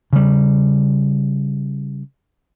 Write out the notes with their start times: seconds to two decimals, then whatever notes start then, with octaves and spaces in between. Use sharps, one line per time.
0.13 C#3 G3